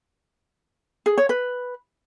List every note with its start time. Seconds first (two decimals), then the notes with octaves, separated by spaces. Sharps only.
1.06 G#4
1.18 C#5
1.29 B4